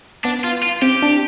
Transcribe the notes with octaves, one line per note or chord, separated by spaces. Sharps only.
B3 D4
F4
F4
C4 G4
D4